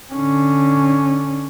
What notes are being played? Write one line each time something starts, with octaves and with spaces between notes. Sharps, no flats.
D3 C#4